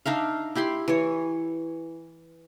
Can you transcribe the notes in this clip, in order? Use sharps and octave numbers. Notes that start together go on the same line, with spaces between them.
D4 D#4 E5 F5
E4 G4 B5 C6
E3 C#5